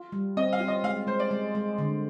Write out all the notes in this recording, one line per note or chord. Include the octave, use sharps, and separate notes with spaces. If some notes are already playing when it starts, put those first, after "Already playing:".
Already playing: F4
G3
C4 D#5
F5
F4
D#5
G#3 F5
G#3 C5
D5
G#3
G#3
D3